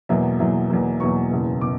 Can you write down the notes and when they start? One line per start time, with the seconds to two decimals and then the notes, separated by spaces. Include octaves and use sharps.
0.09 E2 B2 F#3 A#3 E5
0.39 E2 B2 F#3 A#3 E5
0.70 E2 B2 F#3 A#3
1.00 E2 B2 F#3 A#3 C#6
1.31 F#1 E2 B2
1.61 B2 D6